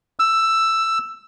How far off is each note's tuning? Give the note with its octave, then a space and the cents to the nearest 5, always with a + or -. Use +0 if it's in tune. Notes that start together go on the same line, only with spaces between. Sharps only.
E6 +10